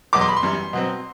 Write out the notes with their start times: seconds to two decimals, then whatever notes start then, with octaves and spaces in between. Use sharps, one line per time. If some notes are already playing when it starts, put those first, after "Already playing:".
0.13 E2 B2 F#3 D6
0.21 C6
0.29 B5
0.36 C6
0.43 F#2 E3 G3
0.73 B2 F#3 C4